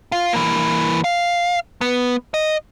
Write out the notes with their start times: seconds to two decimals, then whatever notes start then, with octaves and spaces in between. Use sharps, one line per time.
0.12 F4
0.33 E3 A#3
1.04 F5
1.81 B3
2.34 D#5